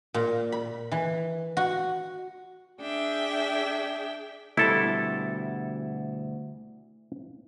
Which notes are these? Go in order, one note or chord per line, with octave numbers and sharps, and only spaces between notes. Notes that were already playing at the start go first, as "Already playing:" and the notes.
A#2
B5
E3
F#4
D4 G#4 E5 G5
D2 B2 G3 E4 A4 A5